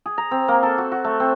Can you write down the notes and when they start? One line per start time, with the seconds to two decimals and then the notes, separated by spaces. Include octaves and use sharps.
0.06 G#4
0.18 A#5
0.31 C4
0.48 A#3
0.63 A4
0.78 F#4
0.92 F#4
1.04 A3
1.20 C4